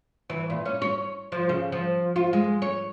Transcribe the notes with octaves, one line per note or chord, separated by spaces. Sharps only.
E3
A#2
C#4
C#5
F3
C#3
F3
F4
G#3
C#5